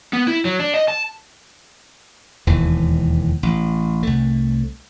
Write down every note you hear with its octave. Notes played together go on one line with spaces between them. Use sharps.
B3
E4
F#3
D4
D#5
A5
E1 D#2 E3
A1
C2 A3